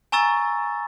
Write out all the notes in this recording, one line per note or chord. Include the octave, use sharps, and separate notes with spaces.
G#5 A#5 C#6 E6 A6